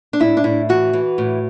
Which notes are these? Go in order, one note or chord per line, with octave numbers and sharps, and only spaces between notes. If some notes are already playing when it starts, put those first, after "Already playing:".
D4
A2 E4
D4
A2 E4
E3 F#4
E3
A2